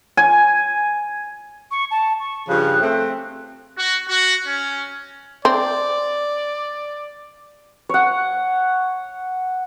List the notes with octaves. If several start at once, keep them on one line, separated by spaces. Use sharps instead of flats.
G#5
C#6
A5
C#6
G2 C#3 F3 F#6
A3 C4
F#4
F#4
C#4
C4 D5
C#5 F#5